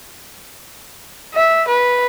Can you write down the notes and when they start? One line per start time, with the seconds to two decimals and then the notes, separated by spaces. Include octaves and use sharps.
1.35 E5
1.68 B4